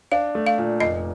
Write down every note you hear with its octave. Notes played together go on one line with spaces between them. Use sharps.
D4 F5
A3
F5
A#2
F1 D#5